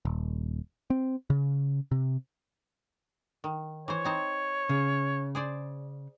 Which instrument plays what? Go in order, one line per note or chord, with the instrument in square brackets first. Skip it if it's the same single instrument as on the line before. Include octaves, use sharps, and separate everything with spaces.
[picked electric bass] D#1
C4
C#3
C3
[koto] D#3
[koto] E3 C5 [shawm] C#5
[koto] C4 D#4 C5
[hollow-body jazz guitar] C#3
[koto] G#4 C5 D5